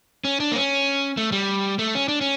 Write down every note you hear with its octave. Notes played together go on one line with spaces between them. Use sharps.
C#4
D4
A#3
C#4
A3
G3
A3
C#4
D4
C#4